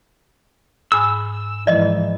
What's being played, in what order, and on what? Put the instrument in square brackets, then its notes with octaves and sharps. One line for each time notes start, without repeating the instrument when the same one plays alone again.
[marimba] G#2 G#5 B5 [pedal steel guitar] E6
[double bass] G#2 E3 [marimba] F3 [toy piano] D5 D#5